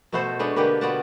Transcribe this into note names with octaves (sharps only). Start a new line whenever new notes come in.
B2 A3 B3 F#4 A4 C5
G#3 A3 D4 B4 C#5 D#5
B2 D3 A#3 G4 A#4 B4
B3 F4 F#4 D5 F#5 A5